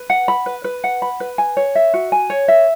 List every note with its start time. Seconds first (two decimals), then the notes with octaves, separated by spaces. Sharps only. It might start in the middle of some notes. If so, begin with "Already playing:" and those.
Already playing: B4
0.10 F#5
0.28 B5
0.46 B4
0.64 B4
0.84 F#5
1.02 B5
1.20 B4
1.38 G#5
1.57 C#5
1.75 E5
1.94 F#4
2.12 G#5
2.30 C#5
2.48 E5